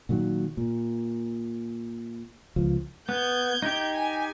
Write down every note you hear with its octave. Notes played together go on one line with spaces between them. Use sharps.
A#2 D#3 F#3
A#2
C#2 F3
B3 G6 G#6
D#4 G4
G#5